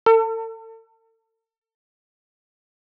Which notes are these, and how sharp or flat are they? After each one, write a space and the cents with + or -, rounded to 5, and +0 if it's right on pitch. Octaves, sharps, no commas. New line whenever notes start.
A4 +35